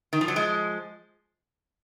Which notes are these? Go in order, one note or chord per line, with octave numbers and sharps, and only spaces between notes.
D#3
F3
F#3
F3 G#3